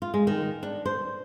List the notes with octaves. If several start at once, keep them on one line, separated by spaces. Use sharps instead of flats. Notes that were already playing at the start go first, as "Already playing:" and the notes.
F4
G#3
D#3
D4
C5